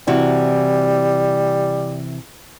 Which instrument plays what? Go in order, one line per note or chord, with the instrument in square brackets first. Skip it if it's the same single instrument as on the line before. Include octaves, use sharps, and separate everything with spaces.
[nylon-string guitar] C3 E3 F#4 [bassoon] G3